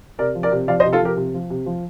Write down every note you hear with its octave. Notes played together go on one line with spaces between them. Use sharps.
C3 A#4 D5
F3
A#4 D5
C3
F3 D5 F5
C5 D#5
C3
F4 A4
F3 G4 A#4
C3
F3
C3
F3